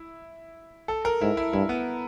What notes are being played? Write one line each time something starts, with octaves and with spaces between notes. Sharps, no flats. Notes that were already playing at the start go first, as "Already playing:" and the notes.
Already playing: E4
A4
A#4
G#2 E4
E4
G2 E4
B3